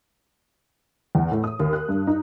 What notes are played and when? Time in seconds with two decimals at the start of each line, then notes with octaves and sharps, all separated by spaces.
1.15 E2
1.32 A2
1.44 D#6
1.60 D#2
1.73 F#6
1.89 G2
2.07 D#4